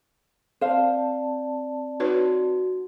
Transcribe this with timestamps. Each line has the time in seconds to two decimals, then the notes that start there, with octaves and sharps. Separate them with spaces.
0.61 C4 C5 D5 F5 A5
2.00 D#4 F#4 B4 C#5